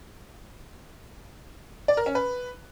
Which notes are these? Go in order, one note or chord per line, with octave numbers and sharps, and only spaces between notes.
D5
A#4
C#4
B4